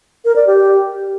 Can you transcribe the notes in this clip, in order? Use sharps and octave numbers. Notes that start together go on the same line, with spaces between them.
A#4
D5
G4